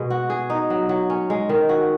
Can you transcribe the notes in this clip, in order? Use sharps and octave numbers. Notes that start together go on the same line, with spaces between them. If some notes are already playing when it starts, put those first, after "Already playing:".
Already playing: B2 G#3 B3
F#4
G#4
D#4
F#3
F#3
C#4
G#3
D#3
F#4